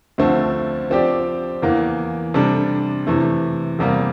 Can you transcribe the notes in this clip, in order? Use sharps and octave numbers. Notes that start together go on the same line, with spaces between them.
D2 D3 F3 A3 C4
F3 C4 G4 D5
E2 E3 A#3
C3 G3 D4 A4
C3 E3 A3
E2 C3 G3 A#3